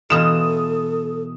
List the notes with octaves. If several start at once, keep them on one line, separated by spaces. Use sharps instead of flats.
B2 E3 F4 A4 D#6 E7